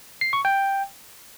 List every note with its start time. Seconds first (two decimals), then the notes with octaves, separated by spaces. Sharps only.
0.21 C7
0.33 C#6
0.45 G5